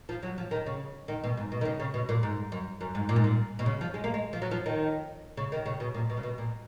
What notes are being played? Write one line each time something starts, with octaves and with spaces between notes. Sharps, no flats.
F3
F#3
F3
D#3
C#3
D#3
B2
G#2
B2
D#3
C#3
C#3
B2
A#2
G#2
F#2
F#2
G#2
A#2
G#2
A#2
B2
C#3
F3
G#3
A#3
G#3
F3
F#3
F3
D#3
C#3
D#3
C#3
B2
A#2
B2
C#3
B2
A#2